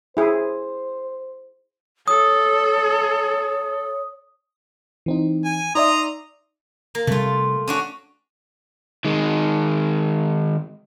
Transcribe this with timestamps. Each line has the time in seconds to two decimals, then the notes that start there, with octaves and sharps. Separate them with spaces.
0.17 E4 G#4 C5
2.08 A4 C#5 D#6
5.06 E3 C4 D#4
5.45 G#5
5.75 D#4 D5 E5 A#5 C6 D#6
6.95 A#3
7.07 C3 G3 A3 F4
7.68 C#4 D4 F#4
9.05 D#3 G#3